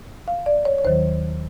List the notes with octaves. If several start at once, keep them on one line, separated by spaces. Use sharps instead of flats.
F5
D5
C#5
C#5
D#2 D#3 F#3 C5